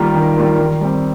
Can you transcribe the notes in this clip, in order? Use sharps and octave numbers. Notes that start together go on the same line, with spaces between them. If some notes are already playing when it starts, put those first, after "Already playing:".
Already playing: D#3 G3 A#3 F4 A#4
D#3
G3 A#3 F4 A#4
D#3
G3 C4